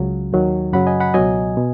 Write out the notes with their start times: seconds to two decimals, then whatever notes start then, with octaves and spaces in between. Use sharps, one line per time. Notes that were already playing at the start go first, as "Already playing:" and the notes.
Already playing: C#2 C#3 F#3
0.32 D#2 D#3 F#3
0.73 F#2 C#3 F#3 F#5 B5
0.87 D#5 G#5
1.00 F#5 B5
1.14 C#2 B2 F#3 D#5 G#5
1.57 B2